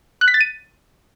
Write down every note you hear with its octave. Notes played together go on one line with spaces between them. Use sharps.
F#6
B6
A6
D#7